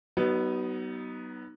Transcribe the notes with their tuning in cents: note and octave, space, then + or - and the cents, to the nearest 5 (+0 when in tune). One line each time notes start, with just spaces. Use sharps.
F#3 +40 B3 +0 D#4 +0